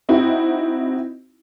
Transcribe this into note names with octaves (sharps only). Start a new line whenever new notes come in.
C4 D#4 E4 F#4